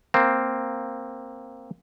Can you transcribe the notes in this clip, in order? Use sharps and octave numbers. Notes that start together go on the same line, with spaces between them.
A#3 C4